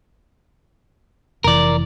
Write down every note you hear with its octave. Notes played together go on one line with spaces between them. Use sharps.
F1 E3 A#4 D5